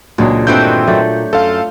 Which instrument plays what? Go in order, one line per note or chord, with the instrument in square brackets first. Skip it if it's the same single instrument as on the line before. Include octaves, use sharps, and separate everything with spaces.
[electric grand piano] C#2 [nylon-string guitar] A#2 D4 [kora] F#3 G#3 G#4
[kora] G2 A3 F#4 [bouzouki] D#3 E3 C4 [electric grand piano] G6
[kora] F#3 A3 D5
[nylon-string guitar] F#2 [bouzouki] F4 [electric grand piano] A4 F5